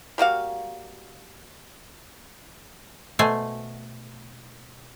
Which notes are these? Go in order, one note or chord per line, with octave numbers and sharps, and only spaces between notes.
G3 A#3 F#4 F5
B2 A3 C5 G#5